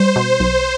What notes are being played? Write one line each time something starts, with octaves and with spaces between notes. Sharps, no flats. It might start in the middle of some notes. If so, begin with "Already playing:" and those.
Already playing: G3 C5
B2
B1